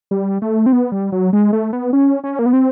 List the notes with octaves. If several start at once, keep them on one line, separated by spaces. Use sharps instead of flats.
G3
A3
C4
B3
G3
F#3
G#3
A3
B3
C#4
C#4
A#3
B3
C4